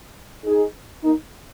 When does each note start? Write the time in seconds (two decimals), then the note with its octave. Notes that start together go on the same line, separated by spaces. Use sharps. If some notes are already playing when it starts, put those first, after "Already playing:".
0.45 D#4 G#4
1.03 A#3 D#4